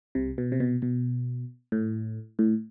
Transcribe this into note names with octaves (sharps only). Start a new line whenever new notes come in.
C2 C3
B2
C3
B2
B2
A2
A2